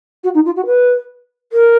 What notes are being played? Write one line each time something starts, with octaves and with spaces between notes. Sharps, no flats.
F#4
D#4
F4
F#4
B4
A#4